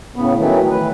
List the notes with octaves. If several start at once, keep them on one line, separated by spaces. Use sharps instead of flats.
A2 C#3 B3
D#3 E3 F#3 A3
B4